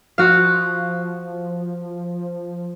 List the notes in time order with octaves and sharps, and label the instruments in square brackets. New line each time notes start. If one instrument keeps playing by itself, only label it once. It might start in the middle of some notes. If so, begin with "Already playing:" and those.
[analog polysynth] F3 [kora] F#4 F5